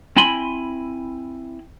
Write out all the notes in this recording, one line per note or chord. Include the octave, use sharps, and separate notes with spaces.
C4 E4 G#5 B5 C6